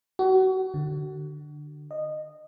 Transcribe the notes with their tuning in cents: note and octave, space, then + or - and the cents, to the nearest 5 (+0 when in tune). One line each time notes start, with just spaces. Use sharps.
F#4 +30
D3 +15
D#5 -20